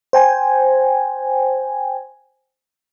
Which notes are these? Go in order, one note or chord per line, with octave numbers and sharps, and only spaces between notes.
C5 G5 G#5